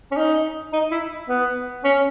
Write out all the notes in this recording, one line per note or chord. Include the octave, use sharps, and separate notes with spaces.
C#4
D#4
D#4
E4
B3
C#4